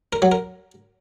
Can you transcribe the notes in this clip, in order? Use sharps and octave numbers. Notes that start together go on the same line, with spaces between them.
A#4
F#3
A#4